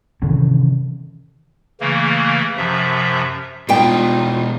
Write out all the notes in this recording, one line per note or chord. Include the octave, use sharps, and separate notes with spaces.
C3 D#3 E3 C#4
C#3 E3 A3 A#3
F#2 C3 F3 E5
B2 G3 G#3 D#4 F4 G5